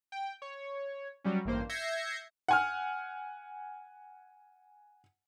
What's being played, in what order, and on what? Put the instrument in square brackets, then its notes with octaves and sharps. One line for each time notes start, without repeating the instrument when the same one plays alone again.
[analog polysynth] G5
C#5
F#3 G3 C#4
A1 G2 A#3 C5
E5 G6 G#6 A#6 C7 C#7
[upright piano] F#5 G#5 F6